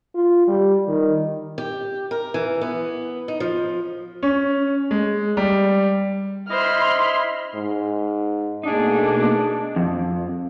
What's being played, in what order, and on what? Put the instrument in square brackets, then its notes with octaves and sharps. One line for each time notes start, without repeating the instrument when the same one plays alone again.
[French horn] F4
G3
D#3
[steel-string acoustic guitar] G4
A#4
E3
B3
D#4
F3
[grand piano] C#4
G#3
G3
[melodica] E4 D#5 [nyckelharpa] C5 [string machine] B5 C6 [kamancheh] F6
[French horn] G#2
[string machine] B2 A3 A#3 [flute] D4 [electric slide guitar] D#4 G#4 [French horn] D#5
[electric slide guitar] F2